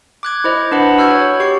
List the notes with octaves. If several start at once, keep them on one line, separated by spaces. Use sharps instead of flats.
D6 F#6 G#6
E4 C5 D#5
D4 B4 F#5 B5
F#4 E6 F6 G6 G#6
C#5
G4 C#6 C7